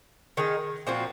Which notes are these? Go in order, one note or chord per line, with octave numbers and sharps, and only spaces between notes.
D#3 G#3 D#4
A#2 F3 C4 F#4